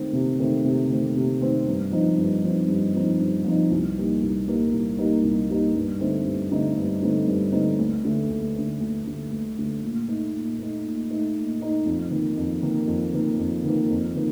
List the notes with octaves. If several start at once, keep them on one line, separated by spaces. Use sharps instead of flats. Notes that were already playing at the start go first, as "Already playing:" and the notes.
Already playing: D#3 A3 C4
C3
D#3 A3 C4
C3
D#3 A3 C4
C3
D#3 A3 C4
G2
F3 C4 D#4
G2
F3 C4 D#4
G2
F3 C4 D#4
G2
F3 C4 D#4
C2
A#2 G3 A#3 D#4
C2
A#2 G3 A#3 D#4
C2
A#2 G3 A#3 D#4
C2
A#2 G3 A#3 D#4
G2
D3 A3 C4 D#4
G2
D3 A3 C4 D#4
G2
D3 A3 C4 D#4
G2
D3 A3 C4 D#4
D2
D3 A3
D2
D3 A3
D2
D3 A3
D2
D3 A3
A#2
A3 D#4
A#2
A3 D#4
A#2
A3 D#4
A#2
A3 D#4
F2
D#3 A#3
F2
D#3 A#3
F2
D#3 A#3
F2
D#3 A#3
F2
D#3 A#3